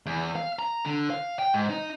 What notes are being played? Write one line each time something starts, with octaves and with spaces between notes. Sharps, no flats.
E2
F5
A#5
D3
F5
G5
G#2
D#4